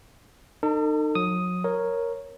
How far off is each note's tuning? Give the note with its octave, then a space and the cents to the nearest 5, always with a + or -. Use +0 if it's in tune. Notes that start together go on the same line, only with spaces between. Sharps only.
D#4 -30 A4 +40
F#3 -35 D#6 +5
A#4 +0 C#5 -5